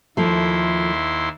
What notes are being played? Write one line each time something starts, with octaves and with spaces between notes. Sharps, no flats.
D#2 F3 A3 E4 C6